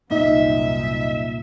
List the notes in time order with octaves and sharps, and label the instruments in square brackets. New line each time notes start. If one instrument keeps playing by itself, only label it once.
[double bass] C2 F#2 [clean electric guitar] A#2 [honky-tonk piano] D#4 [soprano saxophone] E5